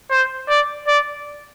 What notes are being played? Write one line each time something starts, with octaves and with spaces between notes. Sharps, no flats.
C5
D5
D5